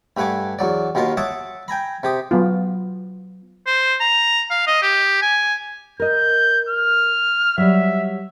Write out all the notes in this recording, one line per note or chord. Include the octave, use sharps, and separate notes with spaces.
G2 A3 B4 F#5 G#5 D6
E2 F#3 D5
D#2 B2 F4 A#4 F5
C#5 E5 F#5 A5 D6 D#6
G5 G#5 A#5 B5
C3 G4 D#6
F#3 B3 F4
C5
A#5
F5
D#5
G4
G#5
A#4 D#5 G6
F6
F#3 G3 E5